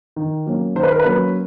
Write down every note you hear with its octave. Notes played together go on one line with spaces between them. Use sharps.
D#3
F#3 A#3 C#4
D#3 C5
B4
A#4
B4
F#3 A#3 C#4